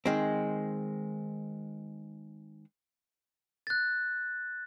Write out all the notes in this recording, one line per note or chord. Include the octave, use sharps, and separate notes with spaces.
D#3 G#3 C4
F#6 A6